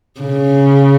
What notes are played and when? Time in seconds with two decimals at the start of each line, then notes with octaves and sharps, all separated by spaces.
0.21 C#3